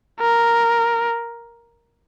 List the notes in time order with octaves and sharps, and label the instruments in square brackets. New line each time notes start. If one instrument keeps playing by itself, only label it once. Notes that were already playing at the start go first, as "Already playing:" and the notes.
[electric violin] A#4